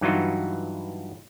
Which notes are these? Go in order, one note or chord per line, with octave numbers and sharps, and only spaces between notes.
G2 E3 F#3 D#4 F4 F#4